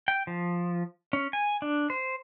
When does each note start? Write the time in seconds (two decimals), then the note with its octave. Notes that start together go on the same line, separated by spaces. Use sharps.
0.08 G5
0.27 F3
1.13 C#4
1.33 G#5
1.62 D4
1.90 C5